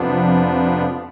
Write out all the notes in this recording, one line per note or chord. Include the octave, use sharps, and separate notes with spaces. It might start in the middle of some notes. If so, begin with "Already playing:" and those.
Already playing: F2 C3 F3 B3 D4